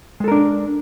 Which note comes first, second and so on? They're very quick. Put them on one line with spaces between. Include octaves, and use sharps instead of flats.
G#3 A4 A#4 D4